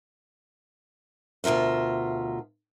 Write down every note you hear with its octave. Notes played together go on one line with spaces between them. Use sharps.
D2 B2 F4 A#4 E5